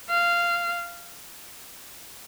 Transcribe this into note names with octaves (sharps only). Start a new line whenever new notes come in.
F5